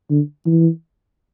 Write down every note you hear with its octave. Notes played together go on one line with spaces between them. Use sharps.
D3
E3